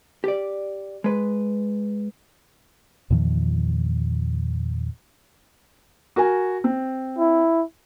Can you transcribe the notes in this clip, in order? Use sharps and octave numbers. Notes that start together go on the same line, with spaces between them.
G4 D5
G#3 B4
E2 A#2 D#3 F3
F#4 A#4 G#5
C4
E4